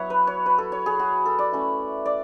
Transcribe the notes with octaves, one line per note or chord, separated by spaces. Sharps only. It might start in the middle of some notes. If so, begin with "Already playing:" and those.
Already playing: F#3 B3 E4 C#5 F#5 B5
B4
C#5
B4
A4
C#5
G#4
F#4
A4
D5
A3 C#4 E4
D5